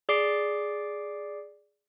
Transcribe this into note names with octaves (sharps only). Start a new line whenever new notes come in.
G#4 D5 D6 C7 D7